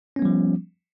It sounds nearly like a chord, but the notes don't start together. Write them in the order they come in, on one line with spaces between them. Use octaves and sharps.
C#4 B3 G3 F3